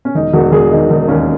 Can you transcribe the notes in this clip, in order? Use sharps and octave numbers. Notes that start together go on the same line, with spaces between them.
C#4
E1 D#4
E1 F#4
E1 G#4
D#3 D#4
E1 D#4
D#2 C#4